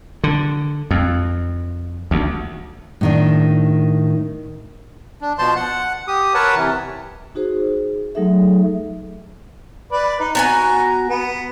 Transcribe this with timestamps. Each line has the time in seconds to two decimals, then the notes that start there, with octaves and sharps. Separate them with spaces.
0.24 D3
0.91 F2
2.11 D2
3.01 A2 D#3 D4
5.21 D4
5.39 B2 F3 C5 A5 C6
5.56 F#5
6.08 G4 D#6
6.34 A#4 B4 C#5 F#5 A5
6.55 C3 E3
7.35 D#4 F#4 G#4 C5
7.60 G#4
8.15 F#3 A3 D#4 G#4 A4 E5
9.92 B4 D5
10.20 D#4
10.35 B3 F#4 G#5 A#5
11.08 B3